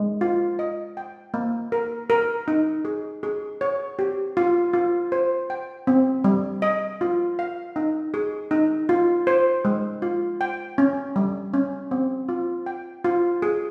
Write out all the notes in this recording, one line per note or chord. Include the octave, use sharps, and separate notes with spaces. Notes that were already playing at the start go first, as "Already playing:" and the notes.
Already playing: G#3
F4
D#5
G5
A#3
A#4
A#4
D#4
G#4
G#4
C#5
G4
F4
F4
C5
G5
C4
G3
D#5
F4
F5
D#4
G#4
D#4
F4
C5
G#3
F4
G5
C#4
G3
C#4
C4
F4
G5
F4
G#4